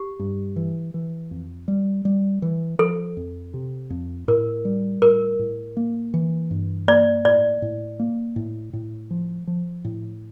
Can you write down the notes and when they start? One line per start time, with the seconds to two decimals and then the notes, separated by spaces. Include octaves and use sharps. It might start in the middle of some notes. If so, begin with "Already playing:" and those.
Already playing: G4
0.19 G2
0.56 E3
0.94 E3
1.31 F2
1.68 G3
2.05 G3
2.42 E3
2.79 F3 A4
3.17 F2
3.54 C3
3.90 F2
4.28 A2 A#4
4.65 G3
5.02 A2 A#4
5.39 A2
5.77 A#3
6.14 E3
6.51 G2
6.88 A#3 D5
7.25 A2 D5
7.62 A2
7.99 A#3
8.36 A2
8.73 A2
9.11 F3
9.47 F3
9.85 A2